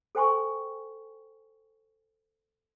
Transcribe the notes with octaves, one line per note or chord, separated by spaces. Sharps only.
A4 C5 G5 G#5 C6 C#6